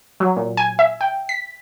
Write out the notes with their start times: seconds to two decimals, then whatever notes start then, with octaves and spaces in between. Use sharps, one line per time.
0.20 F#3
0.36 A#2
0.57 G#5
0.79 E5
1.01 G5
1.29 B6